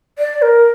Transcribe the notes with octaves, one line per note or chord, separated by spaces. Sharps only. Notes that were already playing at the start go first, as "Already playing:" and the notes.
D5
A#4